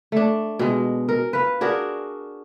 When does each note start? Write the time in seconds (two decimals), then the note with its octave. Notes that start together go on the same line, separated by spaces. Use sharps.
0.12 A3 D4
0.59 B2 G#3
1.08 A#4
1.33 B4 F5
1.61 D4 F#4 G#4 A#4